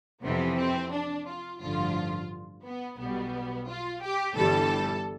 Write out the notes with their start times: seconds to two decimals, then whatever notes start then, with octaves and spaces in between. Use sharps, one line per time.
0.23 F2 C3 E3 B3
0.57 C4
0.92 D4
1.27 F4
1.60 A1 G2 D3 F3 F4
2.65 B3
2.98 B1 B2 G3 B3
3.68 F4
4.01 G4
4.36 G1 G2 E3 G3 A4